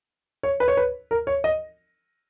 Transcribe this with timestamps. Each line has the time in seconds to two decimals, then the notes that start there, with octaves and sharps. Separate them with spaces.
0.43 C#5
0.60 B4
0.68 C#5
0.77 B4
1.11 A#4
1.27 C#5
1.44 D#5